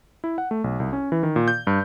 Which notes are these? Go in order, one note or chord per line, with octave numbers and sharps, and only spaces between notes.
E4
F#5
A3
B1
C2
C#4
E3
D#3
A#2
G6
G2